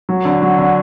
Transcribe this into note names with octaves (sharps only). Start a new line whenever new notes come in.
F#3
D3
F#3
D3